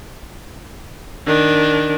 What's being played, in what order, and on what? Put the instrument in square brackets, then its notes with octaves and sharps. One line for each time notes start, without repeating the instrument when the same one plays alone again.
[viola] D#3 D4